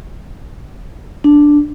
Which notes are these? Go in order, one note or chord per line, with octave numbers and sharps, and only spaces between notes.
D4